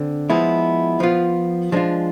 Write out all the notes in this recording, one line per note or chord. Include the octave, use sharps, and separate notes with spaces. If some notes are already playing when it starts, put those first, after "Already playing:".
Already playing: D3 C4
F3 G#3 B3 E4
F3 B3 F4
F3 G#3 D4 F4